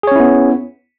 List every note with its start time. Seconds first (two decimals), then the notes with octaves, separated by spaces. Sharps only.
0.03 G#4
0.07 C#5
0.12 C#4
0.16 E4
0.20 B3